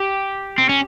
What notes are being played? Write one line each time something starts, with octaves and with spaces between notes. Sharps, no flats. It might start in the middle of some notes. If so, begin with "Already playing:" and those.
Already playing: G4
C4
C#4